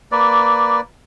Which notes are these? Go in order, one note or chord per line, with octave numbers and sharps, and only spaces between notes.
A#3 B4 D5